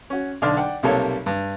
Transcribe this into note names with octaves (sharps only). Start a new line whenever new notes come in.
C#4 F#4
B1 D3 D4 D5 C6 F6
D5 F#5 G5
B1 C3 G3 A#3 A4 C#5
G2